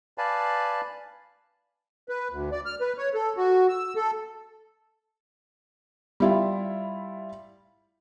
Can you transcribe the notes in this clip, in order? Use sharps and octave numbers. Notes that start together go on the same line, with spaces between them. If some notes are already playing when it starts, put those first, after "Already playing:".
B4 D5 F5 G#5 A5 B5
B4
D2
D5
F6
B4
C#5
A4
F#4
E6
A4
G3 E4 F4